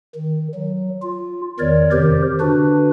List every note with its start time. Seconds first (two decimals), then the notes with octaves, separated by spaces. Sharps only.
0.15 D#3
0.54 F#3
1.02 F4
1.59 E2 D#3 A#4 C#5 D5
1.92 F2 C3 D#3 G4 A#4 C5
2.40 D3 D4 F#4 B4